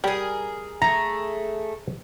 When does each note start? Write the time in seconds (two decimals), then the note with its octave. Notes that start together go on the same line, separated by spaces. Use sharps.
0.04 G3 G#4 A#4
0.82 A3 G#4 A#5